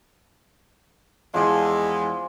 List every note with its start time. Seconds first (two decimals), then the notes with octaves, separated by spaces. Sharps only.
1.34 E2 F3 G#3 D5 G#5